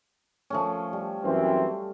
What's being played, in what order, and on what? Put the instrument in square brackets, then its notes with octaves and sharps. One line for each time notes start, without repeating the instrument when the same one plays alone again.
[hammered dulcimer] F3 A3 C#4
G3
[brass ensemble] F#2 E3 C4